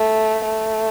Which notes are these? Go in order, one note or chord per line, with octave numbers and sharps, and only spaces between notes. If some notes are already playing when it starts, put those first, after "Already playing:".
Already playing: A3
A3